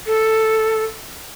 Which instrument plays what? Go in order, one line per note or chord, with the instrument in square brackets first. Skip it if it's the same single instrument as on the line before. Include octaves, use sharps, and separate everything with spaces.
[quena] A4